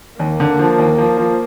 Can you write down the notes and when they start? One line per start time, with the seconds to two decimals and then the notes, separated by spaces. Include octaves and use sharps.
0.19 D#2 A#3
0.40 D3
0.59 F3
0.79 D#2
0.98 F3
1.18 F3